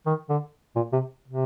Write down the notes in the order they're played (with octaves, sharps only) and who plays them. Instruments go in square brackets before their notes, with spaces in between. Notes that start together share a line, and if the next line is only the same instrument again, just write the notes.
[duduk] D#3
D3
A#2
C3
C3